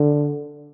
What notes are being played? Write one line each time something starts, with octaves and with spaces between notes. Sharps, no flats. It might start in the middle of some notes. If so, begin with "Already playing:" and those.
Already playing: D3